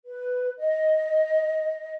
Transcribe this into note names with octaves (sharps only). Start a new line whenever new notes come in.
B4
D#5